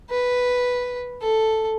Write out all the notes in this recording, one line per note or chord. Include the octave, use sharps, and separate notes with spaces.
B4
A4